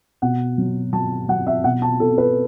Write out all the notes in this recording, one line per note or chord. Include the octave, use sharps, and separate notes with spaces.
B2 F#5
F#3
F#3 A5
F#3 F#5
E5
B2 F#5
A5
B2 A4
B4